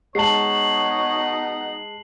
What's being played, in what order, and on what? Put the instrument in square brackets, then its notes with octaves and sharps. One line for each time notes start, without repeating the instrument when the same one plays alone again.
[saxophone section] B2 D#4 F#5 [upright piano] G#3 A5 [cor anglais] C#5 [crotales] C7 F#7